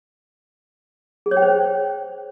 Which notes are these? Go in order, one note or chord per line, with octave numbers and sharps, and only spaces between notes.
G#4
C#5
G5
C5